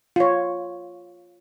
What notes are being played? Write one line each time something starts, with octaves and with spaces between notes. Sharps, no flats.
F4 C#5